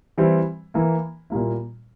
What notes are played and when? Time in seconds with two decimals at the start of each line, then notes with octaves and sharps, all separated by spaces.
0.18 E3 G3 C4 E4
0.74 E3 A#3 E4
1.30 A#2 G3 A#3 E4